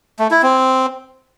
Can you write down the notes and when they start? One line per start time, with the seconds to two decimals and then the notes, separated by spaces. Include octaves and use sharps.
0.19 A3
0.31 E4
0.43 C4